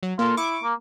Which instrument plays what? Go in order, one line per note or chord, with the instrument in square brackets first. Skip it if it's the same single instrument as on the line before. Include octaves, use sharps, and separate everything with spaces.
[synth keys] F#3
[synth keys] A#3 A4 [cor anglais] F4
[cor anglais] E4 [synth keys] C#6 D6
[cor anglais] A#3